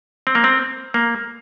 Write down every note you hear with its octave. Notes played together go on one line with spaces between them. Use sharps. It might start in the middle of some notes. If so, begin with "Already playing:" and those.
C4
A#3
C4
A#3